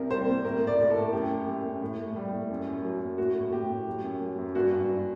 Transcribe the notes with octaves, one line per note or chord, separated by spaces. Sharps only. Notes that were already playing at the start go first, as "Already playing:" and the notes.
Already playing: C2 C3 A#4
G3 C5
C3
A2 A#4
A2
D5
A2 A#4
A4
A2
F#2 G4
F#2
F#2
F#2
A2
A2
G3
A2
F#2
F#2
F#3
F#2
A2 F#4
A2
A2 G4
A2
F#3
F#2
F#3
F#2
G2 F#4
G2
G2